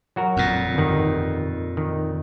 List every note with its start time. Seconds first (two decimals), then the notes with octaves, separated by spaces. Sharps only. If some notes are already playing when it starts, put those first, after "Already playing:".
0.16 F#3 F#4 A#4
0.37 F2 A#2
0.75 G1 D#3
1.77 D#3